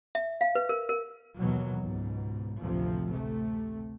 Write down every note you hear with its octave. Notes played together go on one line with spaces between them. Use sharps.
E5
F5
B4
A#4
A#4
D#2 B2 E3 F#3
C#2 G#2 B2
A1 D2 C3 F3
C3 A3